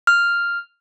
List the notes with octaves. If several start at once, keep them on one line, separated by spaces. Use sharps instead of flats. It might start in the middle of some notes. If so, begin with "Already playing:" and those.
F6